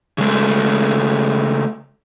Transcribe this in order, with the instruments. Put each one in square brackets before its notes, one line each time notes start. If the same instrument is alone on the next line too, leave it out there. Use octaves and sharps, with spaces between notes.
[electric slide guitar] C#3 G#3 A3